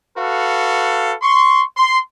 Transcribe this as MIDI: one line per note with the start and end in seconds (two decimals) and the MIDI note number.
0.17 1.14 66
0.17 1.14 69
0.17 1.14 71
0.17 1.14 77
1.22 1.62 84
1.22 1.62 85
1.76 1.98 84